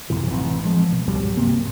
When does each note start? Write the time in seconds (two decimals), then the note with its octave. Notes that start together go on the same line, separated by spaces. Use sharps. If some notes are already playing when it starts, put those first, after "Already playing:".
0.10 B1 F#2 C3 E3
0.30 A1 E3 C4
0.65 F3 G#3
0.92 B2
1.07 C#2 G#2 F#3 G3
1.37 G2 C3 A#3 C4